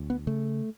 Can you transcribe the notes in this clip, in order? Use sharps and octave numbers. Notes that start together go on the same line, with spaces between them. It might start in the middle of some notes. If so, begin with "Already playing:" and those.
Already playing: D2
B3
C#3 A3